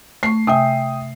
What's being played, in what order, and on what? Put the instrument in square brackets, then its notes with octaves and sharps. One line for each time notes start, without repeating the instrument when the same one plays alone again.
[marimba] A3 C#6 [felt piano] C7
[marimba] C3 G#5 [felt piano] E5 G5 D#6